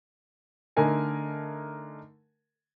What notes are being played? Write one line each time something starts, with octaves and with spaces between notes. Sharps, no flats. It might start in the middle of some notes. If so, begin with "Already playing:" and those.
D3 A3 D#4 A#4 G#5 A5